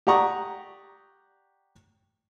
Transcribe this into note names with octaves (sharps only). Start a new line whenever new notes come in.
G4 D5 F#5 A#5 C#6 D#6